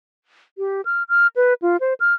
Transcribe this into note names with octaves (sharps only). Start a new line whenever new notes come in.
G4
F6
F6
B4
F4
C5
F6